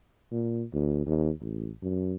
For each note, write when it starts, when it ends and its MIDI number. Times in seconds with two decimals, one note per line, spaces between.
0.31 0.64 46
0.73 1.03 38
1.06 1.30 39
1.41 1.70 33
1.83 2.16 42